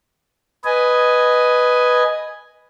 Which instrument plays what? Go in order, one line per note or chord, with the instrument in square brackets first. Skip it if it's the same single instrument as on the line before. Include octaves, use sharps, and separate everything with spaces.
[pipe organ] B4 D#5 G#5